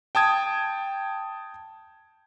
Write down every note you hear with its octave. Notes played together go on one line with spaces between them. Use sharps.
G5 A5 D#6 G#6